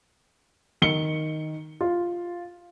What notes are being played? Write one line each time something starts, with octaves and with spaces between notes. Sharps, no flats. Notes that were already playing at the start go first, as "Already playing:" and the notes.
D#3 C#7 G7
F4